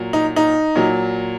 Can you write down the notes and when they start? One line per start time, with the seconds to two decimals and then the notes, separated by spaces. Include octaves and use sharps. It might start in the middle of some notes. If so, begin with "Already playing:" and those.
Already playing: A#2 F#3
0.13 D#4
0.36 D#4
0.75 A#2 F#3